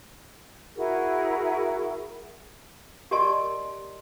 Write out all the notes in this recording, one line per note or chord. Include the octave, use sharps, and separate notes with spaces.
E4 F#4 G#4 A#4
G4 A#4 D5 D#5 A5 C6